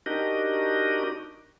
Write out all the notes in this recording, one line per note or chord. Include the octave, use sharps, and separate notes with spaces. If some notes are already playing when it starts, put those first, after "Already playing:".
D4 D#4 F#4 G4 A#4 D#5